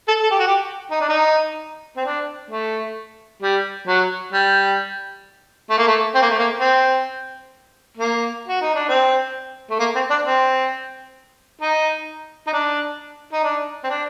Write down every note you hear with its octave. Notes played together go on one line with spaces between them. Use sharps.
A4
A4
G4
F#4
G4
D#4
D4
D#4
C4
D4
A3
G3
F#3
G3
A3
A#3
A3
C4
A#3
A3
A#3
C4
A#3
F#4
D#4
D4
C4
A3
A#3
C4
D4
C4
D#4
D#4
D4
D#4
D4
C4
D4